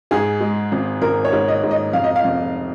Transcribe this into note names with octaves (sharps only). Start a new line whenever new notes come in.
G#2 G#4
G#3
G#1
G#1 A#4
C#5
G#2
D#5
G#2
D#5
F1 F5
D#5
F5
F1